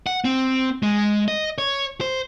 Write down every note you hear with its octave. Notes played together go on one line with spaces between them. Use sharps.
F#5
C4
G#3
D#5
C#5
C5